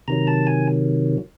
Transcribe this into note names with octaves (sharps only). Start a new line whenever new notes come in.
C3 D#3 F#3 A#5
A5
G#5